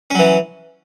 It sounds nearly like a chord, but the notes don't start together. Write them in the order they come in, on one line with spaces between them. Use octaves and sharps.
C#4 F#3 E3